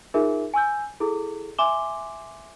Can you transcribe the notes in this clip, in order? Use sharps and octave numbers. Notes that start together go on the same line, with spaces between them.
D#4 F4 G#4 A#4 E5
G#5 C#6 E6 G6
E4 G#4 A4
E5 G#5 C6 D6 E7 G7